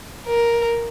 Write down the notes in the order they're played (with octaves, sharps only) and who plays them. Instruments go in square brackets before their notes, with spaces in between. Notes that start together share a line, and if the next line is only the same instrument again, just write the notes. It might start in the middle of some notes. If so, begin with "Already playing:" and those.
[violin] A#4